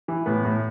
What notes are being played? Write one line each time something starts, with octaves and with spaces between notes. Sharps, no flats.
E3
A2 B3
A2